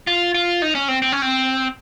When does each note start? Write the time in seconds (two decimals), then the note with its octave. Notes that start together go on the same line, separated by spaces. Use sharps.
0.07 F4
0.35 F4
0.62 D#4
0.75 C#4
0.88 C4
1.02 C4
1.12 C#4
1.22 C4